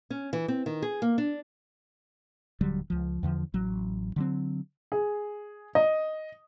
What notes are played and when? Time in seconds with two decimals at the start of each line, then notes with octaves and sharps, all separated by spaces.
0.10 C#4
0.33 E3
0.48 C4
0.66 D#3
0.82 G#4
1.02 A#3
1.18 D4
2.61 D#1 D3 F#3 G3
2.90 C#2 F3
3.23 E2 D3 F3
3.54 A1 F#3
4.16 D3 F#3 C4
4.92 G#4
5.75 D#5